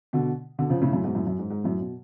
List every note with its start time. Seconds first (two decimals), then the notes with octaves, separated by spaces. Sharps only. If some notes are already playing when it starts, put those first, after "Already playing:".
0.13 B2 D3
0.59 B2 D3
0.70 C#3 F3
0.81 A2 C#3
0.93 F#2 A2
1.04 G#2 B2
1.15 F#2 A2
1.27 F#2
1.39 G#2
1.50 G#2
1.64 F#2 A2
1.80 B2